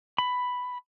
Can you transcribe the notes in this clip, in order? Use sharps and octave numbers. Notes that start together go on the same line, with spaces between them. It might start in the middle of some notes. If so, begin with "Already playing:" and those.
B5